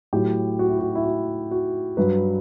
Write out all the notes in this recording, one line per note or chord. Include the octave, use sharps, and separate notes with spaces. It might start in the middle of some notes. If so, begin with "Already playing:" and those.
A2 F#3 G4
F#4
E4
F#4
E4
F#4
F#4
G2 F#3 B4